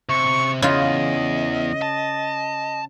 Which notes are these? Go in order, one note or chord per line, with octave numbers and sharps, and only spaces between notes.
C3 C#6
E2 C#3 F4 D#5
A5